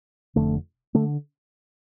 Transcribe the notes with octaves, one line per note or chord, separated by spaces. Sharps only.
F1 F2 D3 A3
D3 A3